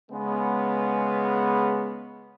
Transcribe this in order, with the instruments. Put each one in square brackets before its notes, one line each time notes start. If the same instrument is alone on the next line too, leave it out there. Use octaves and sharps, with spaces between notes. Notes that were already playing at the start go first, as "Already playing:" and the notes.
[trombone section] C#3 G#3 B3